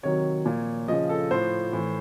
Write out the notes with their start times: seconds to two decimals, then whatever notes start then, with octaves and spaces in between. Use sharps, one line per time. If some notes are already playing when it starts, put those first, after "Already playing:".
0.03 C3 D#3 F#3 C#5
0.46 A#2 F3
0.88 C#3 F3 D#5
1.09 A4
1.31 A2 F3 C5
1.73 A2 E3